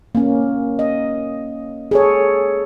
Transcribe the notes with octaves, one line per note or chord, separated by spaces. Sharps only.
A#3 C#4
D#5
G#4 A4 C#5